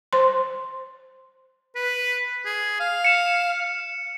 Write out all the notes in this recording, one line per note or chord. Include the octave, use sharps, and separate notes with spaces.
C5 C6
B4
G#4
F5
C#7 E7